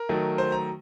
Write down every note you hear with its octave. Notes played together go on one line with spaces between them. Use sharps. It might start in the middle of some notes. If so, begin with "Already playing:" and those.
Already playing: A#4
D#3 F#3 A3
C5
A#5